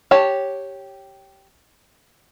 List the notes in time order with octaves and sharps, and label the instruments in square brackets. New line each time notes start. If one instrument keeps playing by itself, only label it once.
[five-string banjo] G4 C#5 A5